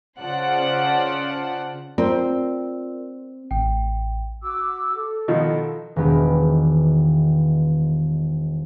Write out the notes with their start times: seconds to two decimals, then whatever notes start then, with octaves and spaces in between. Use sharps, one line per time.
0.20 C#3 F4 C5 D5 F#5 A5
1.98 C4 F4 A#4 D5
3.51 A1 G5
4.43 F#4 D6 E6
4.97 A4
5.28 B2 D#3 F3
5.96 E1 D#3 B3 G4